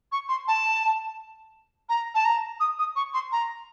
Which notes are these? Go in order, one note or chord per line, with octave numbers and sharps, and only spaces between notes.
C#6
C6
A5
A#5
A5
A#5
D#6
D#6
C#6
C6
A#5